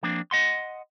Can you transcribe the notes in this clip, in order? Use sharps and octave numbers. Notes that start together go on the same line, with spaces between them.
F3 A#3 C4 D4
D#5 F#5 C6